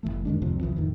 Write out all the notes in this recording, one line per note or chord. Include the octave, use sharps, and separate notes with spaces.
F#1 C#2 E3 A3
F#2 D#3 G#3 D4
C2 F2 C3 F3
C2 E3 F3
D#1 F2 A2 D#3